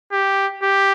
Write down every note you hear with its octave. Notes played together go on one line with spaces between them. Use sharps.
G4
G4